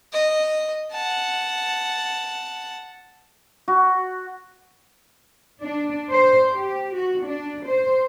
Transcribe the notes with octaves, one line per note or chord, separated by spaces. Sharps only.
D#5
F#5 A5
F#4
D4
C5
G4
F#4
D4
C5